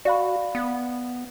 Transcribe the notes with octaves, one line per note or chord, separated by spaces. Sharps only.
F#4 D5 F5 B5
B3